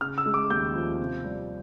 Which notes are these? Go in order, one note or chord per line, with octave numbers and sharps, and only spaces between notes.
C#3 F6
E6
G#3
D6
D#2 G6
F3
C3
G3